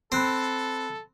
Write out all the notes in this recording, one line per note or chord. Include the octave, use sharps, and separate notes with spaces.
C4 A4 B5 F#6 C7